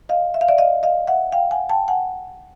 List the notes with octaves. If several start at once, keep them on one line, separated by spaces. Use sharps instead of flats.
D#5 F5
E5
F5
D5 E5
D#5 F5
D#5 F5
E5 F#5
F5 G5
F#5 G#5
G5 A5
F#5 G#5